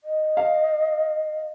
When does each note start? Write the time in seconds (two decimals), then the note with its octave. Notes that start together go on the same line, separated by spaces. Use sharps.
0.04 D#5
0.37 F5